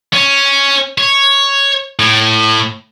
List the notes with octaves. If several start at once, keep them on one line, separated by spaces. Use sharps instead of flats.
C#4
C#5
A2